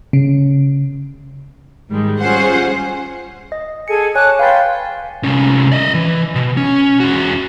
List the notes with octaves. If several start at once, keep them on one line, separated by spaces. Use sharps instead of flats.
C#3
G#2 D#3 G3 G#3
G3 C#4 F4 G#4 C5 F#5
D#5
G#4 A4 G#5 C#7
C#5 G#5 A5 D6 F#6
B4 F5 G5 C6 A6
C2 C#4
D5 D#5
E3
B2
C#4
E2 F#4